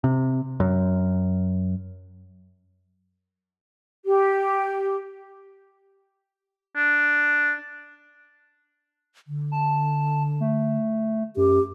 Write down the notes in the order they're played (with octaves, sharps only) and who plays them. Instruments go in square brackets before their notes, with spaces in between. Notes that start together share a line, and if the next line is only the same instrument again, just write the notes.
[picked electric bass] C3
F#2
[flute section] G4
[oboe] D4
[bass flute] D3
[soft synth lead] A5
A3
[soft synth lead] F#2 [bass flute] G4